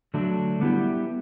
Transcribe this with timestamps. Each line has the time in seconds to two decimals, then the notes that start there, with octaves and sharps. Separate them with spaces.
0.14 D3 F#3 A3 D4
0.61 G3 B3 E4 G4